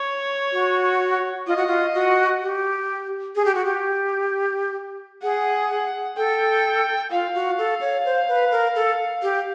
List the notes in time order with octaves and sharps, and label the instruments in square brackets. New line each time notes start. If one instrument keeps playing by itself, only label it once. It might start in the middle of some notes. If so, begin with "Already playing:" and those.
Already playing: [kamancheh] C#5
[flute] F#4
[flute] F4 [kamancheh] D#5
[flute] F#4
F4
F#4
G4
G#4
G4
F#4
G4
[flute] G#4 [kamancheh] F#5
[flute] A4 [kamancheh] G5
[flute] F4 [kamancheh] F5
[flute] F#4
A4
C#5
C5
B4
A#4
A4
G4